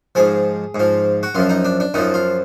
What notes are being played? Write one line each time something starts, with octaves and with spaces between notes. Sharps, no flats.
G#2 F3 G#4
G#2 F3
F#4
F#2 F3 F4
D#4
D4
D4
F#2 F3 D#4
F4